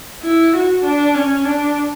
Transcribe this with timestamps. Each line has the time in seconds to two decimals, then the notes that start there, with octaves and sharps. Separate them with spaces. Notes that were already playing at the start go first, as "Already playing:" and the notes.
0.23 E4
0.53 F#4
0.84 D4
1.14 C#4
1.45 D4